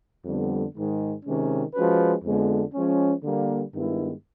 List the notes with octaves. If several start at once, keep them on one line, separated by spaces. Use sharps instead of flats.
F2 D3 G3 B3
G#2 D#3 G#3
C3 D#3 G#3 C#4
F3 G#3 C#4 F#4 B4
F2 D3 F3 G#3 B3
F3 G#3 C#4
D3 G3 A#3
G2 D#3 G#3 B3 E4